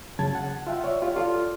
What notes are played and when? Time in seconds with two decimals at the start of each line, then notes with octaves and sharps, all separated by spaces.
0.19 F#2 C#3 A5 G#6 A6
0.35 F#5
0.67 F4 E5 F#5 G5
0.84 C#5 D5 E5
1.02 F4 G4 C#5
1.17 F4 A4 D5